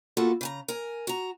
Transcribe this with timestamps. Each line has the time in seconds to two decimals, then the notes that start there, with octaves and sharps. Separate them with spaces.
0.17 A#3 B3 F4 F#4 A4
0.41 C#3 G#5 A#5
0.68 A#4 G#5
1.07 F#4 A#5